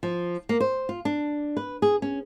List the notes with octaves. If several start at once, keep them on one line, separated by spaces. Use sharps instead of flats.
F3
A#3
C5
F4
D4
B4
G#4
C#4